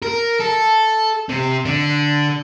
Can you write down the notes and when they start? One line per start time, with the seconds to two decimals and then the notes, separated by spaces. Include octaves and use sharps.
0.03 A#4
0.40 A4
1.29 C3
1.65 D3